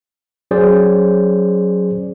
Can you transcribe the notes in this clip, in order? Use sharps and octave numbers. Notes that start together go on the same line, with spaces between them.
F#3 C#4 G#4 C5 D5